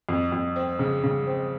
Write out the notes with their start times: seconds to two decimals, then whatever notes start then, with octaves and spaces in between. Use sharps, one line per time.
0.09 F2
0.32 F2
0.56 C4
0.79 C#3
1.03 C#3
1.27 C4